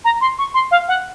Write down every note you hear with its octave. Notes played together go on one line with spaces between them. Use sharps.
A#5
C6
C#6
C6
F5
F#5